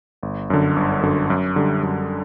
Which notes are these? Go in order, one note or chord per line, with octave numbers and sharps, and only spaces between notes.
G1
F#2 D3
G1
F#2 D3
F#2
D3 G3
F#2